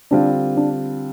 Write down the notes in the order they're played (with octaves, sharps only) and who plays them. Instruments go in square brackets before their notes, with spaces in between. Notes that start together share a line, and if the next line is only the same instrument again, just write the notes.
[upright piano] D3 G3 C4 F4 [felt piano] D4
[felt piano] D4